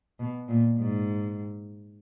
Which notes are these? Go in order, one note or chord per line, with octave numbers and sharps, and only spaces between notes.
B2
A#2
G#2